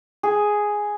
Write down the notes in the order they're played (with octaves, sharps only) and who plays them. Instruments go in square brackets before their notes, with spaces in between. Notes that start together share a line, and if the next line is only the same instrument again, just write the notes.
[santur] G#4